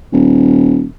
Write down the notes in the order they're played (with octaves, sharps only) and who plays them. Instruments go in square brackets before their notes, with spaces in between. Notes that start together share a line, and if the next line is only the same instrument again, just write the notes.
[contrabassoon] D#1